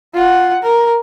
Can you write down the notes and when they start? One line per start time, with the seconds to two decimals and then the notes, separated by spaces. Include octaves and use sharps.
0.14 F4 F#5
0.63 A#4